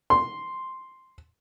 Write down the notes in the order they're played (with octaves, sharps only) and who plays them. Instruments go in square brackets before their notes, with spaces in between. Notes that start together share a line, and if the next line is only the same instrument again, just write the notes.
[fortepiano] C6